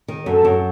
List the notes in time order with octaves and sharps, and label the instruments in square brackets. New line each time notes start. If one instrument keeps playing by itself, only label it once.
[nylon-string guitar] D#3
[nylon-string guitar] F#2 [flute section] A4
[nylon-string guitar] F#2